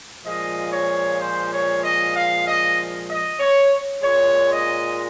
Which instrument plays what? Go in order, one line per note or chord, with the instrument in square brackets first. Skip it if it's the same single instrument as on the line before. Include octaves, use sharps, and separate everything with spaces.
[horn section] A#2 F3 G#3 D#5
C#5
C5
C#5
D#5
F5
D#5
D#5
C#5
A#2 G#3 C#5
D#5